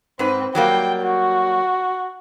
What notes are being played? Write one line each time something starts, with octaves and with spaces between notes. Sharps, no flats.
G#2 C4 B4
F#3 G3 A#3 G5
F#4